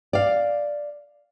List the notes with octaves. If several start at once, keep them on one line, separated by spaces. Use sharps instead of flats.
D5 F5